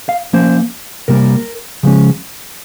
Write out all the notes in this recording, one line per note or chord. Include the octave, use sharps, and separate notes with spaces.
F5
F3 A#3 C#4 C5
C3 G3 A#3 A#4
C#3 F3 G#3 C#4